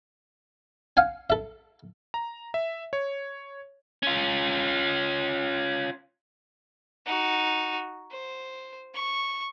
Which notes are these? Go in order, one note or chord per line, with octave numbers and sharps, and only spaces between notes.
F5 F#5 G#5
A4 E5
A#5
E5
C#5
C#4 F4
D#4 F#4
C5
C#6